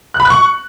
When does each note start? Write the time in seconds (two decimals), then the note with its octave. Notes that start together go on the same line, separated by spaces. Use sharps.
0.14 F#6
0.20 B5
0.25 F#6
0.30 C#6